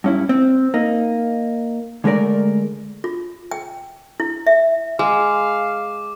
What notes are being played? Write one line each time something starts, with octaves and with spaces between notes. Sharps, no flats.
G2 C#4 E4
C4
A#3 D#4
D3 G#3 A3 A#4 D5
F4
G5
E4
E5
G#3 F5 D6